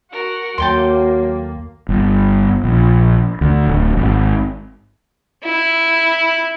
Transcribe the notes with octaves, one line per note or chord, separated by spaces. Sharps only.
F#4 A#4 F#5
D#2 F#3 A#3 A4 G5 C6
G1
A#1
D2
D1
G#1
E4